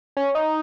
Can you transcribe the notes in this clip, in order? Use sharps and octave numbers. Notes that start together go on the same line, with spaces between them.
C#4
D#4